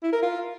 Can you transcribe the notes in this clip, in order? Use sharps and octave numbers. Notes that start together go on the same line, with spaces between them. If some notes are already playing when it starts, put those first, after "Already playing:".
E4
A#4
F4